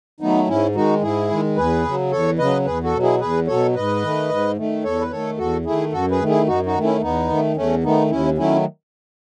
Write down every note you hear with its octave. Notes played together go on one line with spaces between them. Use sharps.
D#3 F#3 A3 B3 D#4
G#2 C#4 E4
D#3 G#3 D#4 F#4
G#2 E4 G#4
D#3 G#3
E2 G#4 B4
C#3 F#3
E2 A4 C#5
C#3 F#3 B4 D#5
E2 G#4 B4
F#4 A4
B2 F#3
E4 G#4
E2 G#4 B4
B2 F#3 A4 C#5
G#2 B4 D#5
D#3 A3
G#2
D#3 A3
E2 A4 C#5
B4
D#3 A3 A4 C#5
E2 F#4 A4
D#3 A3 E4 G#4
F#2 F#4 A4
G#4 B4
D#3 A3
E4 G#4
F#2 D#4 F#4
D#4 F#4
D#3 A3
C#4 E4
E2 B3 D#4
D#3 A3
E2 A3 C#4
D#3 A3 B3 D#4
D#2 C#4 E4
D#3 F#3 A3 C#4 E4